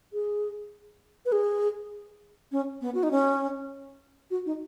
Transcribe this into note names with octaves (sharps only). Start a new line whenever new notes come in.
G#4
B4
G#4
C#4
B3
F#4
D#4
C#4
F#4
D#4